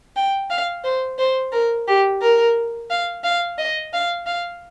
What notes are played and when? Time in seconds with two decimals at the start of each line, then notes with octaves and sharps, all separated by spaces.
0.16 G5
0.50 F5
0.84 C5
1.18 C5
1.52 A#4
1.87 G4
2.21 A#4
2.90 F5
3.24 F5
3.58 D#5
3.93 F5
4.26 F5